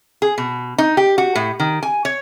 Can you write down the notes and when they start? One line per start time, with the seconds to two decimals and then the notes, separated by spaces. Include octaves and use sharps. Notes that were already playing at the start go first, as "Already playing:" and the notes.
0.22 G#4
0.38 B2
0.78 D#4
0.97 G4
1.18 F#4
1.35 A2
1.60 D#3
1.83 G#5
2.05 C#5